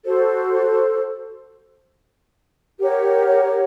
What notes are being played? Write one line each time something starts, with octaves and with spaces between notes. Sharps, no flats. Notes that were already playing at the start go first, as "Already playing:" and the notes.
F#4 A4 C5
G4 A#4 C#5 F#5